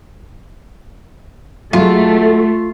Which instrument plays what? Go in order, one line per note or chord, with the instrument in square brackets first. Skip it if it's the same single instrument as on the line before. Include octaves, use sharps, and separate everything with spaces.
[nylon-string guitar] F#3 G#3 [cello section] A3 [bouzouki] F4